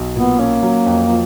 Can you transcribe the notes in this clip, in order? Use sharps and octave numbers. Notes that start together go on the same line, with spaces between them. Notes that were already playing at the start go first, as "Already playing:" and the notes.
Already playing: B1
A#2 B3
A#3 C#4
F#3
F2
F3